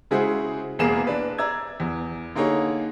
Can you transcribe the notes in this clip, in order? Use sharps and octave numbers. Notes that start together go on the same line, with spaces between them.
C#3 G#3 E4 F#4 G#4 C5
E1 E2 A#3 G#4 C7 E7
D4 B4
D5 A#5 E6 G#6
E2
D3 A#3 D#4 G#4 C#5